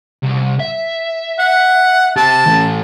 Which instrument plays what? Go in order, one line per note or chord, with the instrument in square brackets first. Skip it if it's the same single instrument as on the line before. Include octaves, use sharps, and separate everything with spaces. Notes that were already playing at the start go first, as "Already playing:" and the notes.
[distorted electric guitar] C2
E5
[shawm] F#5
[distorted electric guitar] G4 C5 [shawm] A5
[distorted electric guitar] E3 A3